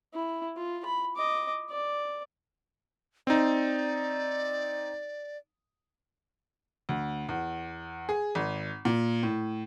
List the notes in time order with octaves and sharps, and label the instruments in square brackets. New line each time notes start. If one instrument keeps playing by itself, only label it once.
[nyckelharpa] E4
F4
B5
D#5 D6
D5
[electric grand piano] C4 D#4 [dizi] D5
[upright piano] D2
E2
G#4
G#1
A#2
A2